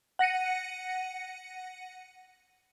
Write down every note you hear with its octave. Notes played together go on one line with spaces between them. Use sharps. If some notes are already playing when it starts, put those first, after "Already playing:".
F#5 A#6 C#7 D#7